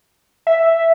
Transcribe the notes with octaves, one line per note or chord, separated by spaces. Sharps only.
E5